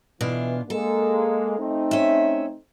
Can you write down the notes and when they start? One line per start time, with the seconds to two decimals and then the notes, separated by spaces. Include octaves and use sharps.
0.21 B2 E3 D4 F4
0.70 G#3 A#3 A4
1.59 A3 C4 D#4
1.91 C#4 E5